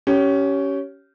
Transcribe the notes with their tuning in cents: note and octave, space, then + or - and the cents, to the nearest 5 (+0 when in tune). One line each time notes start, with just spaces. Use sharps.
C#4 +10 G4 -25